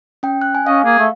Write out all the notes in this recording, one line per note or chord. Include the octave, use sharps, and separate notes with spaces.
C#4 G5
F#6
G#5
C#4 D#5 F5
A#3 G#4
A3